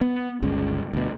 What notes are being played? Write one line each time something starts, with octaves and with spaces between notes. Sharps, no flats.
B3
G1 C#2 C#3
D2 B2